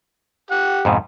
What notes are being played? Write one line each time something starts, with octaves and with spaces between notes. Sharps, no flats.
G4 F#5
F2 G#2 B2